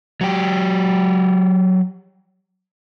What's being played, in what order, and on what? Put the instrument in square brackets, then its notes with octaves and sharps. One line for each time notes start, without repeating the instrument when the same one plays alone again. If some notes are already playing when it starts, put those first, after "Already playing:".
[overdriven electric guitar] F#3 G4